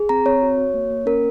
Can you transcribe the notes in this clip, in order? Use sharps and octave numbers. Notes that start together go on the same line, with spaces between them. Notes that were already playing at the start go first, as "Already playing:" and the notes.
Already playing: G#4
C4 A#5
C4 C#5
F#4
F#4
A#3
A#3
C#4 A#4